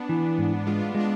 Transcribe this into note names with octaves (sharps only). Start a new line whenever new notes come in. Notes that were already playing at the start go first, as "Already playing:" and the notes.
Already playing: B3 D4
E3
G#2
G#3 D4 F4
G#3
D4